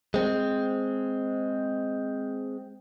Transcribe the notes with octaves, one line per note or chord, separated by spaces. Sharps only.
G#3 C4